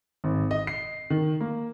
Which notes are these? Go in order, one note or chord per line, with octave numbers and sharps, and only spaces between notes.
G#1
D#5
C7
D#3
A#3